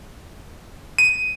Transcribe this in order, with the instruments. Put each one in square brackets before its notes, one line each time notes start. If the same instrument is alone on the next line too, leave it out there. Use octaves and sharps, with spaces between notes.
[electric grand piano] D#7